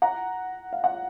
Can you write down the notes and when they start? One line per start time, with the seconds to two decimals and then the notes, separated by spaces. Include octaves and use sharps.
0.02 F#5 A#5
0.73 F5
0.84 F#5